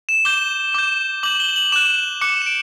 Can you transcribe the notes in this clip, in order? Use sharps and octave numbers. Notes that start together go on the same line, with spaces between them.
E7
D6 G6 G7
D6 G6
D6 G6 F#7
G7
F#7
D6 F#6 E7
D6 F#6 C#7
E7
D7